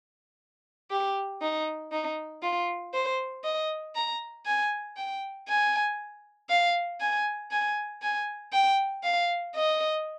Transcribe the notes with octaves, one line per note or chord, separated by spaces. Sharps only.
G4
D#4
D#4
F4
C5
D#5
A#5
G#5
G5
G#5
F5
G#5
G#5
G#5
G5
F5
D#5